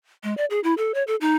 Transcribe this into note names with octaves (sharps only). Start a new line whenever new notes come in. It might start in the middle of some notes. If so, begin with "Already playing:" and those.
G#3
D5
G#4
E4
A4
C#5
A4
D#4